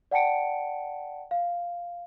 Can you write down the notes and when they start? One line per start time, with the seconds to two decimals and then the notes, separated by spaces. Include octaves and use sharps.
0.11 D5 F#5 G5 A5 C#7 D7
1.31 F5